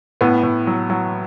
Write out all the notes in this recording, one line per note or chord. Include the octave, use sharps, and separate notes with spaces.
A2 B3
A2
F#3
F#3